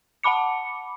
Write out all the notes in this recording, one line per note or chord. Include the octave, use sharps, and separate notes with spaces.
F#5 A5 B5 D6 C#7